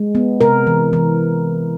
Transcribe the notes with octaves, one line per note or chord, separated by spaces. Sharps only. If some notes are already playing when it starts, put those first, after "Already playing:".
Already playing: G#3
B3
C3 A#4
E3
E3